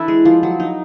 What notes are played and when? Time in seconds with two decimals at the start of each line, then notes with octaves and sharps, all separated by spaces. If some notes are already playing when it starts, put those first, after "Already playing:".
Already playing: E3 D4 E4 A4 B4
0.08 G#3
0.25 F3
0.43 F#3
0.60 D#4